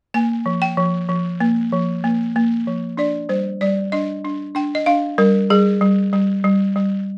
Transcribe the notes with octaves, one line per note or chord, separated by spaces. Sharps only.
A#3 G#5
F3
G5
F3
F3
A#3
F3
A#3
A#3
F3
D4 D5
G3 C5
G3 D5
D4 D#5
D4
D4 G5
D#5
D4 F5
G3 A#4
G3 G#4
G3
G3
G3
G3